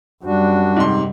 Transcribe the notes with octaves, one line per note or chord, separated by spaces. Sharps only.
F#2 G3 D4 F#4
G#2 C3 C6